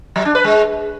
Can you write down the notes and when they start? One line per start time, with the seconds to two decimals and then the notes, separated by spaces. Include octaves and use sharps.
0.16 F#3
0.25 D4
0.35 B4
0.44 G#3